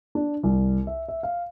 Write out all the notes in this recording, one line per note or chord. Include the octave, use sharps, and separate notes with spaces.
D4
C2
E5
E5
F5